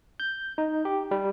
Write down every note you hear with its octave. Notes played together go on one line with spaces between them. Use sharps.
G6
D#4
G4
G3